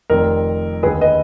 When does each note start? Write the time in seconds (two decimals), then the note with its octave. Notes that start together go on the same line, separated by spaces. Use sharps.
0.10 F1 F2 D#3 A#4
0.83 D#2 D3 G#4 B4
1.01 B4 D#5